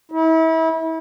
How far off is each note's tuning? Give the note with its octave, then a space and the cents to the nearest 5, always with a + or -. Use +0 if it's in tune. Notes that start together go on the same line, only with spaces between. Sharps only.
E4 -35